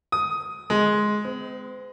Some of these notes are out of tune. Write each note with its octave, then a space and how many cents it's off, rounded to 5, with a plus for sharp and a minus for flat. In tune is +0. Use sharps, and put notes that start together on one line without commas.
D#6 +10
G#3 +10
C4 -40